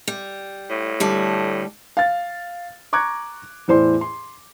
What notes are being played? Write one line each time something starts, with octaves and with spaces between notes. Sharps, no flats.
G3
A2
D2 G3 A5
F5 A6
A#5 C#6 D6 F#6 G#6
E2 A2 C5 D5 C6
C6